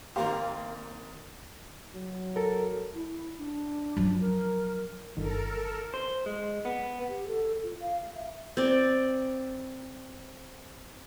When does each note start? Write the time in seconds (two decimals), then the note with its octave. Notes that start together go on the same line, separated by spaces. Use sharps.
0.16 G#1 A#3 G4 F5 A#5 C6
1.95 F#3
2.36 A4 A#4
2.94 E4
3.38 D4
3.97 F3 F#3
4.21 A#4
5.17 G1 D#3 A4 A#4
5.94 C5
6.26 G#3
6.65 B3
7.09 G4
7.27 A4
7.63 F4
7.80 F5
8.15 E5
8.57 C4 D5